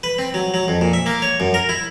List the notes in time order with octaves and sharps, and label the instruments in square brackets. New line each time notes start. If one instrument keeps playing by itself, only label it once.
[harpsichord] B4
C4
F#3
F#3
F2
A#2
E5
A#3
C#5
F#2
A#4
E4